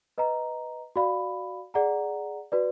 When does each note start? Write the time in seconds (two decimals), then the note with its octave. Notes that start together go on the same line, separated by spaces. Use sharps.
0.18 B4 D#5 A#5
0.96 F#4 D5 F5 B5
1.74 G#4 D5 F#5 A#5
2.52 F#4 B4 D5